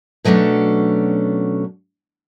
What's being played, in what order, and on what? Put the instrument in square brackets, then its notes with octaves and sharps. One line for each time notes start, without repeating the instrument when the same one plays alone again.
[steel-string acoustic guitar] B2 F#3 A3 C#4 D4